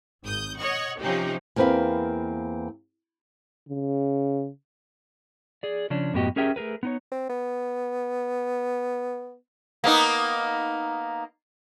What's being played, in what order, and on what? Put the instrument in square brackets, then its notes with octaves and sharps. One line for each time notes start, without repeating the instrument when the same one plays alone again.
[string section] G#1 D#6 G6
C#5 D#5 F#5 C#6
C3 F3 C4 C#4 D#4 G4
[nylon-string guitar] E2 A#3 C4 A#4 B4 F5
[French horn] C#3
[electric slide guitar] G#4 D5
C#3 F3 C#4 D4
F#2 A2 B3 F#4 G4 D#5
C#4 G4 G#4 A#4 E5 G5
A3 G#4 A#4 B4
B3 D#4 C#5
[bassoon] C4
B3
[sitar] A#3 B3 D#4